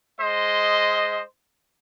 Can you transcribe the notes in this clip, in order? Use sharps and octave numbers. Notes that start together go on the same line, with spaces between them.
G#3 C5 D#5